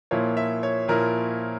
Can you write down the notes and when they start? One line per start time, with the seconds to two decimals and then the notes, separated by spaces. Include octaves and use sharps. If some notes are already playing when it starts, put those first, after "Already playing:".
0.11 A#2 F3 A#3 E4 C#5
0.37 E5
0.63 C#5
0.88 A#2 F3 A#3 E4 A#4